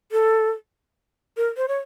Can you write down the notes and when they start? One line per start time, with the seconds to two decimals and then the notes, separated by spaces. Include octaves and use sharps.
0.12 A4
1.37 A#4
1.57 C5
1.68 C#5